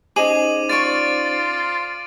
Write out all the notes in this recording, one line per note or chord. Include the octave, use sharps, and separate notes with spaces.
C#4 D#4 G#4 C5 D#5 D6 D#7 F#7
F4 D5 C#6 A6 D7